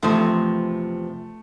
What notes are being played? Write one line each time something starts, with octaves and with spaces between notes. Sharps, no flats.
E2 C3 F3 A3